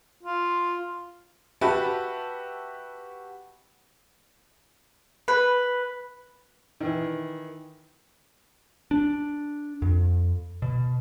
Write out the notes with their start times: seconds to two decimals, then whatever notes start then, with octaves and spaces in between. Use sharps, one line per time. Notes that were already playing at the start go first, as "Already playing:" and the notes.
0.23 F4
1.61 F#4 G4 B4 E5 A5 B5
5.28 B4
6.80 D#3 E3
8.91 D4
9.82 F2
10.62 B2